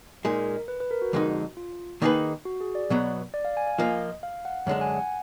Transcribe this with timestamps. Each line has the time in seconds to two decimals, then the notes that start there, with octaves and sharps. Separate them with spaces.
0.25 A#2 G#3 D#4 A#4
0.68 B4
0.80 B4
0.91 A#4
1.02 F#4
1.13 F2 D3 G#3 D#4
1.57 F4
2.02 D#3 A#3 D#4 G#4 B4
2.45 F#4
2.61 G#4
2.75 D5
2.90 B2 F#3 B3
3.34 D5
3.45 F5
3.57 G#5
3.67 F5
3.79 F3 A#3 F4 D#5
4.23 F5
4.45 F#5
4.66 F#2 D3 G#3 D4 F#5
4.81 G#5
4.96 F#5